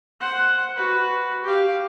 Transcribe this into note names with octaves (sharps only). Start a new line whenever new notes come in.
C5 F#5
F#4 B4
G4 F5